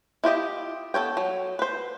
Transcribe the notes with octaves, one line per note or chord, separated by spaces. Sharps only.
E4 F4 G4 D#5
B3 A4 A#4 C#5 G5
F#3
B4 C5